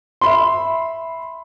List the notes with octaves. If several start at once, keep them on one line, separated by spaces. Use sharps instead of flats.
E5 B5 C6